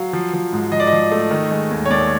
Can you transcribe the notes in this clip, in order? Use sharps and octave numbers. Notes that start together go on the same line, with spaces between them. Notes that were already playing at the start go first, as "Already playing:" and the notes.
Already playing: F#3 F5
F3
F3
G#2
F3 D#5
D5
D#5
F3
A3
D#3
G#3
D#2
C#5
D#2 D5